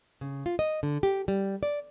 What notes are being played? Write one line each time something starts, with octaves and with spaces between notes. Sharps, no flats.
C#3
F4
D#5
D3
G4
G3
D5